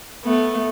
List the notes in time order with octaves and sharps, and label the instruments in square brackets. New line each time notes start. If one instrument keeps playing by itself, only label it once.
[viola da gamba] A3 B3